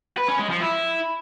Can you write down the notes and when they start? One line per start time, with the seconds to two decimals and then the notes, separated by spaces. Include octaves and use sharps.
0.18 B4
0.28 C#4
0.39 G#3
0.50 F3
0.61 E4